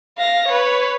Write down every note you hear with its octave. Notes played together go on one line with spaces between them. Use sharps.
F5 A#6
B4 C#5